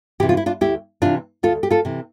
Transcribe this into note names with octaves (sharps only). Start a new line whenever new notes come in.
C3 E3 G4
F4
E4
D4 F4
D2 E4 G4
C3 E3 D4 F4
D2 F4 A4
G4
F4 A4
C3 E3